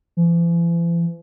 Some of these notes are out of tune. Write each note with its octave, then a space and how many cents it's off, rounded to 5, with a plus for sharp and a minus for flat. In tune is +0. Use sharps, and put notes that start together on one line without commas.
E3 +45